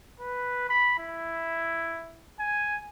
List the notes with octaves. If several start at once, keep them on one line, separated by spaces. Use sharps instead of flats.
B4
B5
E4
G#5